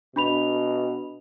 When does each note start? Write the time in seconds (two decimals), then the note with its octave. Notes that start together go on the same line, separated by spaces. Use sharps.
0.16 B2 D4 B5 F7